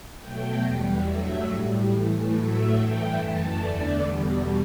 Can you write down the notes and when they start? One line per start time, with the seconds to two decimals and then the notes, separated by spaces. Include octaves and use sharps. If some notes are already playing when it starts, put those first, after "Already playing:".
0.19 B2 F#3 A3 G5
0.62 E2 B2 G3
1.05 G2 F#3 A3 E5
1.48 A2 G3
1.90 A2 E3 A3
2.32 A2 F#3 A3 E5
2.75 G2 E3 A3 G5
3.17 F#2 E3 A3 A5
3.60 E2 D3 A3 D5
4.03 E2 B2 G3